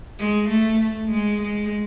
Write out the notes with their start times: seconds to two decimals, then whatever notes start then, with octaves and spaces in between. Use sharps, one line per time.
0.19 G#3
0.49 A3
0.80 A3
1.11 G#3
1.42 G#3